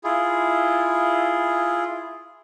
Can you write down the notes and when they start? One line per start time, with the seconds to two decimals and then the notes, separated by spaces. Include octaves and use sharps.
0.04 E4 F4 G#4